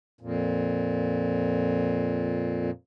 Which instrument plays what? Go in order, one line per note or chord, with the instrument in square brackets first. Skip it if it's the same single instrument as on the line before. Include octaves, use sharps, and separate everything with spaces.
[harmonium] F2 A#2